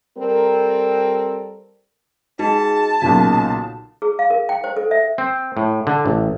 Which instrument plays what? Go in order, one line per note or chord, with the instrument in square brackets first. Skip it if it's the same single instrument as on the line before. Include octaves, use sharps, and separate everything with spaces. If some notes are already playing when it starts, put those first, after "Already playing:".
[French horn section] G3 C4 A4 A#4
[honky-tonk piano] G#3 [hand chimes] D#4 F#4 G#4 [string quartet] A5
[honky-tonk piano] B1 A#2 C#3 [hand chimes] F#4
[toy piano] G#4
F5
A#4
G5
C5
A4
E5
[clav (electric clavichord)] C4
A2
D3
A1